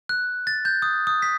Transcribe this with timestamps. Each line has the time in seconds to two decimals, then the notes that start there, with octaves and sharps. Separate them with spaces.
0.09 F#6
0.47 A6
0.65 G6
0.82 D#6
1.07 D#6
1.22 B6